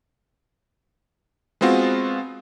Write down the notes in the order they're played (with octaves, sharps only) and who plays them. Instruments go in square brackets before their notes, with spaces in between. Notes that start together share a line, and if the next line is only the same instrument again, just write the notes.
[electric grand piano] G#3 B3 C4 F4 F#4